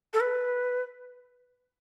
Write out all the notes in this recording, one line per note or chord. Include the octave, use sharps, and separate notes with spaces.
A4
B4